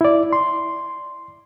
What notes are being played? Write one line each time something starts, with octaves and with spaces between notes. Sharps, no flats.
E4 D5
C6